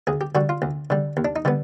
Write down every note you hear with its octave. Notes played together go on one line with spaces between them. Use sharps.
D2 G#4
G4
D3 G3 F#4
F4
D2
D3 G3
D#2
D4
D#4
D3 G3 B3